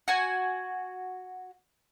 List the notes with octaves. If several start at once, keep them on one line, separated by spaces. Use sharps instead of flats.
F#4 G#5